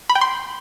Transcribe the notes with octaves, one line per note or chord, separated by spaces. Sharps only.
B5
G5
C6